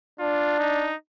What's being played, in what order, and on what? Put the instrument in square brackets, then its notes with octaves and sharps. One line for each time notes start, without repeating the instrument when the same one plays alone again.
[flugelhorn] D4 [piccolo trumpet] F4
[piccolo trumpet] D#4